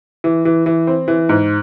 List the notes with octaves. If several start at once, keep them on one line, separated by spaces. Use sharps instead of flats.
E3
E3
E3
C4
E3
G#2